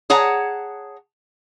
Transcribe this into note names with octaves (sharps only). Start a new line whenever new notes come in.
G#4 C#5 F#5 A5 A#5